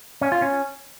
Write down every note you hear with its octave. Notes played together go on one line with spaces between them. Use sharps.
C#4
F4
C#4